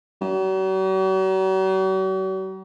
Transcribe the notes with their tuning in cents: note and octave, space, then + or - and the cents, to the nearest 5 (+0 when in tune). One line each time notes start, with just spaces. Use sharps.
F#3 +45